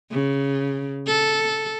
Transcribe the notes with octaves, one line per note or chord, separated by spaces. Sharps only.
C#3
A4